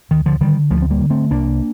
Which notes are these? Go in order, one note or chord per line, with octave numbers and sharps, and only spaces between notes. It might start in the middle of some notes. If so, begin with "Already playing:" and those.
D2 D#3
D3 F3
D3 D#3 G3
D2 F3 A3
C4
G3 A#3
D3
A3 C4
C2 A#3 D4